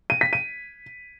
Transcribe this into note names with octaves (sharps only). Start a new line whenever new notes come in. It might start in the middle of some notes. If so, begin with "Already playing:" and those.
D#7
B6
D#7